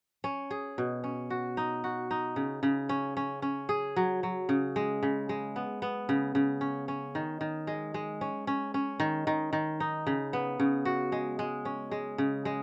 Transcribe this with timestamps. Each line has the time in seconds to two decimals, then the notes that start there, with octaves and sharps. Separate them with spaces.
0.24 C#4
0.51 G#4
0.78 B2
1.04 C#4
1.30 F#4
1.57 D#4
1.84 F#4
2.11 D#4
2.36 C#3
2.63 C#3
2.89 C#4
3.17 C#4
3.42 C#4
3.69 G#4
3.96 F#3
4.23 F#3
4.49 C#3
4.76 G#3
5.03 C#3
5.29 G#3
5.56 B3
5.82 B3
6.09 C#3
6.35 C#3
6.61 C#4
6.88 C#4
7.15 D#3
7.41 D#3
7.67 G#3
7.94 G#3
8.21 C#4
8.47 C#4
8.74 C#4
9.00 D#3
9.27 D#3
9.53 D#3
9.80 D#4
10.07 C#3
10.33 B3
10.60 C#3
10.85 F#4
11.12 G#3
11.39 G#3
11.65 C#4
11.91 G#3
12.18 C#3
12.45 G#3